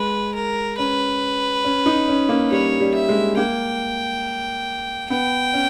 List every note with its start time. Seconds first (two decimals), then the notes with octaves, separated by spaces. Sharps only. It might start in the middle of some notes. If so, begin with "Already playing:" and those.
Already playing: G#3 B4
0.35 A#4
0.78 C#4 B4
1.64 C#4
1.86 D#4
2.08 C#4
2.29 A#3
2.51 G3 C#5
2.80 G3
2.94 E5
3.09 G#3
3.37 A#3 G5
5.10 B3 G5
5.53 C#4